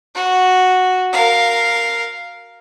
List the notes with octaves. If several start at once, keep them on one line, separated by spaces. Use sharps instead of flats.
F#4
A#4 F5